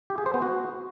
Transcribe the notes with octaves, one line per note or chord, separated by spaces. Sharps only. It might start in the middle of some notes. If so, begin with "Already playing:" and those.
G4
G#4
C5
B3
F#4